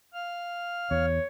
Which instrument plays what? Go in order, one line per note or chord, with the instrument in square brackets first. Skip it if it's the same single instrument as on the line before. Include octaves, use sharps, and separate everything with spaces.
[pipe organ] F5 F6
[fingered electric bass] E2 [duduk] C#5